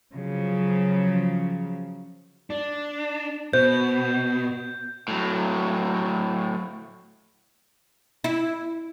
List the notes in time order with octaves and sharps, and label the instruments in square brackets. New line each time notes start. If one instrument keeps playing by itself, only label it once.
[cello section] C#3 F3 F#3
[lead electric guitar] D4
[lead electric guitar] B2 [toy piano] C5 [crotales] G6
[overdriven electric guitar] A2 F#3
[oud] E4